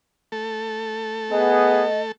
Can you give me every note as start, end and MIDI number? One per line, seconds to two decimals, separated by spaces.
0.32 2.12 57
0.32 2.12 69
1.31 1.85 59
1.31 1.85 68
1.31 2.01 75